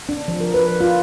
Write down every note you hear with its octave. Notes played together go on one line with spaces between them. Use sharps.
D4
F3
A#4
B4
F4